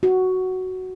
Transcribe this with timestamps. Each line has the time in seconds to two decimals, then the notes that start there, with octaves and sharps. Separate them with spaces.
0.03 F#4